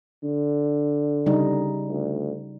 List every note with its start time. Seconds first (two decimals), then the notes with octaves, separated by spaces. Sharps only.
0.23 D3
1.26 C#3 G3 D#4
1.89 D2